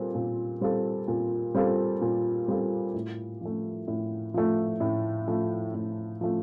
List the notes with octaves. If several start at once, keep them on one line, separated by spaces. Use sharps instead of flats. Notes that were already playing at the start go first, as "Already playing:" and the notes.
Already playing: A#2 G3 C4 F4 A4
A#2
G3 C4 F4 A4
A#2
G3 C4 F4 A4
A#2
G3 C4 F4 A4
A2
F3 A3
A2
F3 A3
A2
F3 A3
A2
F3 A3